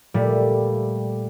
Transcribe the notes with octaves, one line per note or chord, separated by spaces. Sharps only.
A#2 G3 A3